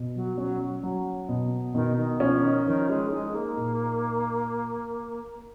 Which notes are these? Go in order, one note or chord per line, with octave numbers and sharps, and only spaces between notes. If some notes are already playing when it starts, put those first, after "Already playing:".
Already playing: B2
F#3
F#3 C#4
F#3
B2
B2 D#3
D#3
F3 C#4
D#3
D#3 F3
G#3
G#3 D#4
A#3
A#2